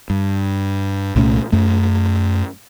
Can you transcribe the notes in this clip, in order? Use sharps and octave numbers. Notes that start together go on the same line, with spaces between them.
G2
C2 A#2 A3 C#4
F#2 A3